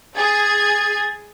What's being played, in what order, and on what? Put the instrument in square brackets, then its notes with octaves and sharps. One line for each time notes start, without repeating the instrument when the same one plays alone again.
[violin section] G#4 G#6 [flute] A6